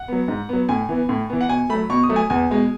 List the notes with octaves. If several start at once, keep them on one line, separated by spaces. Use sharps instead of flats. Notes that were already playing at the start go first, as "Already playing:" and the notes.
Already playing: F#5
F#3 B3
G#2
F#3 B3
A2 G#5
E3 B3
A2
E3 B3
F#5
B2 G#5
F#3 A3 B5
B2 C#6
D#6
F#3 A3
G#5
E2 G#5
B2 G#3